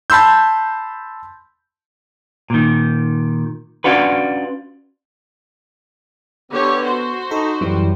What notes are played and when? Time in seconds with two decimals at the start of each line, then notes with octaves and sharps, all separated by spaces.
0.10 A5 B5 C6 E6 G6
2.50 A#2 D#3
3.84 C#4 D4 F4 F#4 B4
6.52 D3 B3 G4 C#5
6.83 F#4 C5
7.31 D#4 A4 B5
7.61 F#2 A2 E3 G3